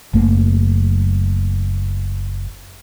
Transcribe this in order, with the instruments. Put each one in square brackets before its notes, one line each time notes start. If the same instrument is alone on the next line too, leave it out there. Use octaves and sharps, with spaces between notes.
[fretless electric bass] F#1 F#2 A3 A#3